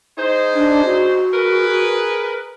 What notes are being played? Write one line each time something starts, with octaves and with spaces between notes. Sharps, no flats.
D#4 G#4 C5
D4
F#4
G#4 A#4 B4